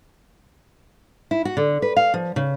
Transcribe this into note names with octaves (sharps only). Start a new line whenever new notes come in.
E4
F#4
D3
B4
F5
F3
C#3